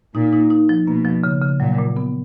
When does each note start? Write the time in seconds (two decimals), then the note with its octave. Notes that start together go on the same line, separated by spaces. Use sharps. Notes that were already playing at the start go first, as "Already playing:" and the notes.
0.15 A#2 D#4
0.33 D#4
0.50 D#4
0.69 F3
0.86 B2 A#3
1.05 F3
1.24 C#3
1.42 C#3
1.60 A#2 F#3
1.78 A#2
1.97 B3